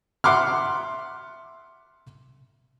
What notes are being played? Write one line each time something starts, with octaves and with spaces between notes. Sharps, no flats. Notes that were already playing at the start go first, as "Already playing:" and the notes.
E5 F#5 C6 D6 F6